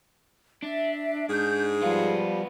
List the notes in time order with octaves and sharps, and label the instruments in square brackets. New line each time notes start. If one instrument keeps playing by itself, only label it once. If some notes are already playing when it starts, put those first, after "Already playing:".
[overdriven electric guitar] D4 [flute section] E5
[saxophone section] G#2 G#4 [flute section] G6
[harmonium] F3 G3 [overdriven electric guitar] B3 F4 [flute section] F5